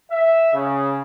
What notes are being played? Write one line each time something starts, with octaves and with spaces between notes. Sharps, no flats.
E5
C#3